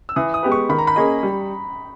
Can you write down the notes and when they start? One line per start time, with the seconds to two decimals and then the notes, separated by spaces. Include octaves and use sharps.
0.09 E6
0.16 E3 D#6
0.34 D#6
0.43 G#3 B3 G4 B4
0.52 C#6
0.69 D#3 B5
0.78 A#5
0.87 B5
0.96 A#3 C#4 G#4 D#5
1.23 G3